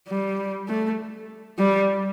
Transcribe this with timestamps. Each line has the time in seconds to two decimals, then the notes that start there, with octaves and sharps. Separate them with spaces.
0.08 G3
0.68 A3
1.58 G3